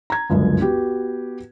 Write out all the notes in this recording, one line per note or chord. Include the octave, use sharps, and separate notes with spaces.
A#5 G#6
G1 C#2 F#2
B3 F#4 G4